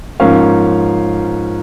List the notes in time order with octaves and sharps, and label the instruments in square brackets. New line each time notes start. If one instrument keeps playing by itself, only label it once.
[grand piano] G#2 F3 A#3 C#4 F5